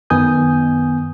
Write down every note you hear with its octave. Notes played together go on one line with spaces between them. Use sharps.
F#2 D#3 B3 G#5 D#6 G6